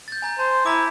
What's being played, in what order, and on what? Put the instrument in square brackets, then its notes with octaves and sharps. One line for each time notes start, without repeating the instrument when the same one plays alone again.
[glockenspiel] G6 A6
G#5 A#5 G6
[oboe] C5 [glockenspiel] A5
[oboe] E4 [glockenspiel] A5 A#5 D6